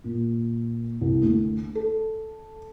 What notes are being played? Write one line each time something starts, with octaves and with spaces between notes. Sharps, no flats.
A#2
C2
D2
A4